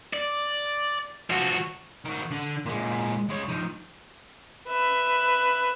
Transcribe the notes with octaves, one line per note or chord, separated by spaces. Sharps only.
D5
F3 F#4
D#3 F#4
D3
A#2 G#3
G#3 C#5
F3 D#4
B4 E5